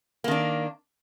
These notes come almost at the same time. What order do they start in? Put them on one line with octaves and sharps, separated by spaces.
A#3 D#3 D4